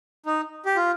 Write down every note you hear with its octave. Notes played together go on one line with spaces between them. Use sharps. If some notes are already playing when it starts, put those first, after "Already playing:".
D#4
G4
F4